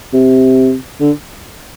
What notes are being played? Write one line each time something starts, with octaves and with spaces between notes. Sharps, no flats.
C3
D3